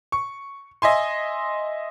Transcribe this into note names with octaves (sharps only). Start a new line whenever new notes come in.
C#6
D#5 E5 G#5 C6